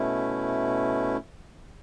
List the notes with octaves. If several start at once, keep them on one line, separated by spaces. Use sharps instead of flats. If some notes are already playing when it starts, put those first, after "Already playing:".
Already playing: B2 A3 C#4 E4